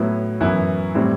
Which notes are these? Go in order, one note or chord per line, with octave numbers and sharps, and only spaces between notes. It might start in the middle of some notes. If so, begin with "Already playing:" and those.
Already playing: A2 F#3 B3 E4
F#2 E3 B3 E4
A2 G3 C4 E4